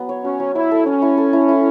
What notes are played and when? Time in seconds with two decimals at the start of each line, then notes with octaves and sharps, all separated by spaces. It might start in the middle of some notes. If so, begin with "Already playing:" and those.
Already playing: F#3 B3
0.09 C#5
0.24 C#4 F#4
0.40 F#3
0.55 E4 C#5
0.71 A4
0.86 C#4 C#5
1.02 E4
1.18 A4
1.33 E4
1.48 E4